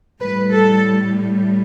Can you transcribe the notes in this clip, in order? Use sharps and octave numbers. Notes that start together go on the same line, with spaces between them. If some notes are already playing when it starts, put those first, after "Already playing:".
A2 G3 B4
A4